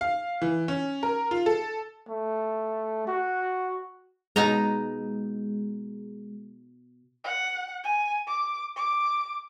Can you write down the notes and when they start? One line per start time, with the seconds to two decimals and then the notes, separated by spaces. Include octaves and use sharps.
0.01 F5
0.42 E3
0.68 C#4
1.03 A#4
1.31 F4
1.46 A4
2.09 A3
3.07 F#4
4.36 B2 G#3 D#4 A#5
7.24 F#5
7.84 G#5
8.28 D6
8.76 D6